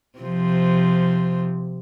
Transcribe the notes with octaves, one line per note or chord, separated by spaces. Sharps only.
C3 F3